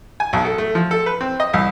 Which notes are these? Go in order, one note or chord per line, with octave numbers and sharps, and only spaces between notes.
G#5
B1
A4
A3
F3
A4
B4
C4
D#5
C2